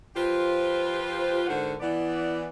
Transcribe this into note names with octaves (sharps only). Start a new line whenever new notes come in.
F3 F4 G4 B4 C5
G#2 D3 F#4 A#4 C5 F#5
E3 B3 D5